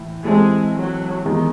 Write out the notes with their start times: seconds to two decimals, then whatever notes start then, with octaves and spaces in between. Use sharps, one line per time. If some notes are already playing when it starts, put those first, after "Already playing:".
Already playing: A2 E3
0.24 C3 E3 G#3 A3 C4
0.75 F#3
1.25 E2 D#3 G#3 D#4